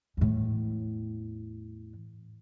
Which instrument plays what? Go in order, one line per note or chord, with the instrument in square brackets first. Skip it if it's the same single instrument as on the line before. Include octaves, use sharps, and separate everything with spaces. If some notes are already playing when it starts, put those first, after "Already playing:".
[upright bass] E2 A2